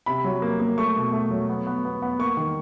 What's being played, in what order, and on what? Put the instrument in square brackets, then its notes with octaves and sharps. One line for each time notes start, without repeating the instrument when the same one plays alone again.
[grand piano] C3 B5
F#3
A#3
A#3
A3 C#6
B2
A3
F#3
B3
B3
B3
B3
A#3 C#6
D#3